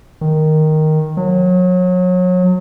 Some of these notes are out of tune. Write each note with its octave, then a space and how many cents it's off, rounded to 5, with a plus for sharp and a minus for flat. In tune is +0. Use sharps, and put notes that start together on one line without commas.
D#3 +0
F#3 -30